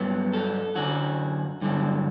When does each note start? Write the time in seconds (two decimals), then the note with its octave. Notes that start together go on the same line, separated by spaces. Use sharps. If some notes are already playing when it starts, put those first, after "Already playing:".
Already playing: G2 F#3 B3
0.33 A4
0.76 F#2 D3 F#3 F#4
1.61 G2 D3 F#3